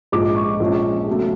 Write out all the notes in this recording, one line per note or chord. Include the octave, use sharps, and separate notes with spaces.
A#1 G#2 F3 G#3 D6
C#6
A#1 A#2 F3 G#3 C#4
E2 C#3 F#3 A3